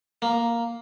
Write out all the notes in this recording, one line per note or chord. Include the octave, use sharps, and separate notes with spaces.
A#3